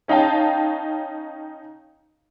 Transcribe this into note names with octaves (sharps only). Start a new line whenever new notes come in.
C#4 D#4 F5 G5 A5